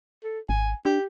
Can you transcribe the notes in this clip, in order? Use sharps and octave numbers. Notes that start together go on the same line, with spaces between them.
A4
G#1 G#5
D4 G4